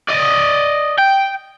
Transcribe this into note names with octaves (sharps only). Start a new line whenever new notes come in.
D5 D#5
G5